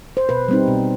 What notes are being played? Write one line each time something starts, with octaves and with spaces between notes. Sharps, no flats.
C5
B2 B4
G3 C4 D#4
B2